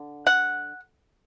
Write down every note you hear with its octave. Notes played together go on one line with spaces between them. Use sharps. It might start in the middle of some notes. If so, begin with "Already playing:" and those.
Already playing: D3
F#5